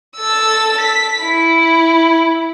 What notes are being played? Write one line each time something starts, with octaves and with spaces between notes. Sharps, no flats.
A4 E6
B6
E4